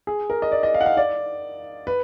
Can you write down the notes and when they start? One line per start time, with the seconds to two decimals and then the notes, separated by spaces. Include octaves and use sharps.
0.07 G#4
0.30 A#4
0.42 D#5
0.52 D5
0.63 D#5
0.74 F5
0.81 F#5
0.86 F5
0.97 D5
1.87 B4